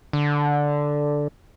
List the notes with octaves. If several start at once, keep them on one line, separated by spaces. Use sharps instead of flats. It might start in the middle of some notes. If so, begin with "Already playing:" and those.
D3